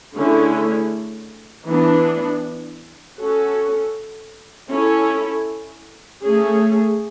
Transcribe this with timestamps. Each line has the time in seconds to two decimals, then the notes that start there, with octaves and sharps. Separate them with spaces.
0.16 D3 A3 C#4 E4 G#4
1.67 E3 B3 D4
3.19 C#4 F#4 A4
4.70 C#4 E4 A4
6.22 A3 C#4 G#4